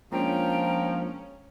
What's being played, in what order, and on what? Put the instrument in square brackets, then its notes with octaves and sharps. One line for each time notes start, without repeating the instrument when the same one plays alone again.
[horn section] F3 [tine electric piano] G#3 A#3 D4 [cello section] C#4 [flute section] G5 A#5